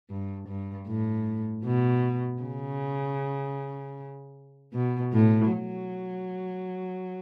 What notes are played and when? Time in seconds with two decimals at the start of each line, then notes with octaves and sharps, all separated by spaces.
0.10 G2
0.48 G2
0.87 A2
1.64 B2
2.42 C#3
4.74 B2
5.13 A2
5.51 F#3